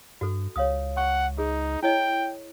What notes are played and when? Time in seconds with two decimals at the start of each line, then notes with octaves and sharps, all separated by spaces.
0.21 G2 F#4 A4
0.56 C#2 C#5 F5 D#6
0.97 F#5 C#6
1.38 D#4 G#4
1.83 E4 C#5 D#5 G5